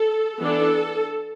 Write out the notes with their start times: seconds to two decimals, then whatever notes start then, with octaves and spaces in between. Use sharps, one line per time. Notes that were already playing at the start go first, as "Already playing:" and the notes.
Already playing: A4
0.40 E3 B3 D4 A4